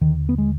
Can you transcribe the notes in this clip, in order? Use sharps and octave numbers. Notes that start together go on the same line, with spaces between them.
D#2 D3 D#3
B3
G#3